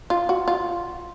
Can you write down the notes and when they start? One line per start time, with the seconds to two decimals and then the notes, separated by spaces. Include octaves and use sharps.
0.10 F4
0.29 F#4
0.48 F4